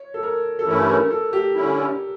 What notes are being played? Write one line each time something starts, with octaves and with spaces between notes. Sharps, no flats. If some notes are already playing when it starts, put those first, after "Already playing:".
Already playing: C#5
A4
A#4
A4
G2 E3 A3 C#4 E4 A#4
A#4
A4
G4
D3 G3 C#4 E4